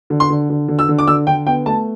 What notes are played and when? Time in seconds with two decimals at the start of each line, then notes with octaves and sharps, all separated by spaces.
0.10 D3
0.20 C6
0.30 D3
0.50 D3
0.68 D3
0.79 E6
0.88 D3
0.99 D6
1.07 D3 E6
1.27 D3 G5
1.46 B3 G5
1.66 A3 A5